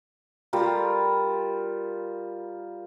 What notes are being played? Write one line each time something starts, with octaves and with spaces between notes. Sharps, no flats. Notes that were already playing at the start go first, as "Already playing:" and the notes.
G3 F4 A#4